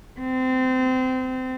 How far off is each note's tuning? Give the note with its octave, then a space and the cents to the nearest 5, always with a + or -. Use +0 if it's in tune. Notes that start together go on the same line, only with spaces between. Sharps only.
C4 -25